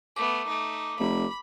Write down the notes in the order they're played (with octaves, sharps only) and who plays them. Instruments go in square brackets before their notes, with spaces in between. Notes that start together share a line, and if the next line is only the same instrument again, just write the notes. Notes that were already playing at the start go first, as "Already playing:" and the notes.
[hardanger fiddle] A3 B3 [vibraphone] D6
[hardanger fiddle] A3 D#4
[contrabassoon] F1 [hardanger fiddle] B5